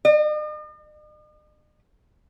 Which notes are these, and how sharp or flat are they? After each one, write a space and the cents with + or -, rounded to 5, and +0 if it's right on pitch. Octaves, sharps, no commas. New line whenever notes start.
D#5 -45